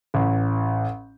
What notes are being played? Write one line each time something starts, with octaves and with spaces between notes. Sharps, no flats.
A1